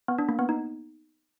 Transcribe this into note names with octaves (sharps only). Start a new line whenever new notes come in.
B3
D4
A#3
B3
D#4